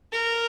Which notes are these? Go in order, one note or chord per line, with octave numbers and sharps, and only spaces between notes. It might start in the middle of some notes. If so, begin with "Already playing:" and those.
A#4